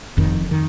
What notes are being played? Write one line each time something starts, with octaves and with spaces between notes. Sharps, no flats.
F1 F2 D#3
D#3